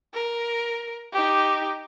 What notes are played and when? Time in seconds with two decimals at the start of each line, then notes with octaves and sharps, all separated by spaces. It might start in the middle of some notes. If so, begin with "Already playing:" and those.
0.14 A#4
1.12 D#4 G4